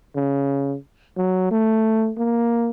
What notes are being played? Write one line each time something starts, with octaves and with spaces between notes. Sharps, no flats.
C#3
F#3
A3
A#3